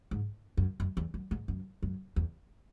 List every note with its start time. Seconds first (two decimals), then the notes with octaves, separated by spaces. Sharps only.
0.11 G#2
0.57 F#2
0.80 F#2
0.97 E2
1.14 F#2
1.31 G#2
1.48 F#2
1.83 F#2
2.16 E2